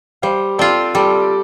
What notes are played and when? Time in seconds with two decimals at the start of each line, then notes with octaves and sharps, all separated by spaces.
0.22 G3 C5 F5
0.58 C4 F4 A4 D5
0.95 G3 A4 D5